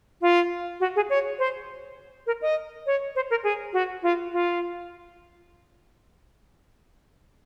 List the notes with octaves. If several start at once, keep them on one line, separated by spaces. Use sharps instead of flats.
F4
F#4
G#4
C#5
C5
A#4
D#5
C#5
C5
A#4
G#4
F#4
F4
F4